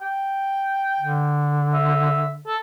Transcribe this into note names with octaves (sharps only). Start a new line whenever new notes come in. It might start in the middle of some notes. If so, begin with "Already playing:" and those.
G5
D3
E5
A4